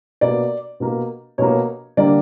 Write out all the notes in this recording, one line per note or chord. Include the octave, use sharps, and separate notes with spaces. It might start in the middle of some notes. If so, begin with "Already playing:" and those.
B2 A#3 D5
B2 A#3
B2 A#3 C#5
D3 G3 A#3 D5